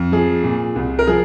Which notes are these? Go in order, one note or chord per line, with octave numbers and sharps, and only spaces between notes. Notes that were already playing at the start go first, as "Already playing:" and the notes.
Already playing: F2
F3 G#4
A#2
C2
A#4
F3 G#4